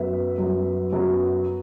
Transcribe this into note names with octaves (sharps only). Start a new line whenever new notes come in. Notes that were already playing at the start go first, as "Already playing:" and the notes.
Already playing: F#2 F#3 B3 B4 E5
F#2 F#3 B3
F#2 F#3 B3